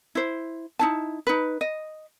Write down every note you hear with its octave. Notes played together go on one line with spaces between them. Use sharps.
E4 C5
D#4 E4 A5
D#4 B4
D#5